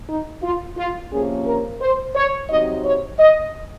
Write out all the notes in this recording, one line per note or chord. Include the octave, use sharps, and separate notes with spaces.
D#4
F4
F4
C3 F3 A#3 C#4 G#4
A#4
C5
C#5
C3 F#3 C4 D#4 D#5
C#5
D#5